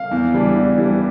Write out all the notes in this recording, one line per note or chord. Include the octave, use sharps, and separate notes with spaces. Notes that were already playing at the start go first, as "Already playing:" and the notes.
Already playing: F5
E2
E3 G3 D4
E2
E3 G3 D4